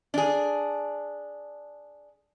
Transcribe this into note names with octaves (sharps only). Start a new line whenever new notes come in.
D4 G#4